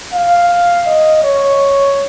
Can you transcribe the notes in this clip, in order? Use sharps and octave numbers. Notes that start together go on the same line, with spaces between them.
F5
D#5
C#5